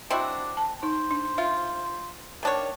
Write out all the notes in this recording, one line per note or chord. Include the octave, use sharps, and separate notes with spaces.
C4 D4 E4 F#4 D#5
A5
D#4 C5
D4
F4 E5
D#3 A#3 D4 C#5